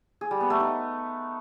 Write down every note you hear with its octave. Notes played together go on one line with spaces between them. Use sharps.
G#4
G3
B3
A3
D#4